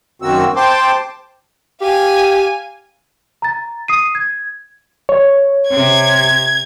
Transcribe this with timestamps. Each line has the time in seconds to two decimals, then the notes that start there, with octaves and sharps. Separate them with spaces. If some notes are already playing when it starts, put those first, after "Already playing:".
0.22 F#2 D#3 A#3 C4 F#4 E6
0.56 C5 G5 A5 C6 D6
1.81 G4 F5 G#5
3.42 A#5 A6
3.88 D#6 C7 D#7
4.15 G#6
5.09 C#5
5.70 C3 G#6